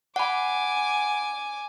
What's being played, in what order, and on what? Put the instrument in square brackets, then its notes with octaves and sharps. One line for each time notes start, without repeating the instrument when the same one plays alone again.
[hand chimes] F#5 B5 [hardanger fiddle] G#5 D6